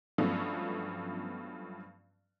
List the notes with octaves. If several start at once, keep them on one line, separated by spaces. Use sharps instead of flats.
G2 F3 F#3 A3 B3 C#4